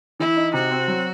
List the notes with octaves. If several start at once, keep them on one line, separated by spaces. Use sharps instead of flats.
E3 E4
D#4
C3 F#4
C4
F#3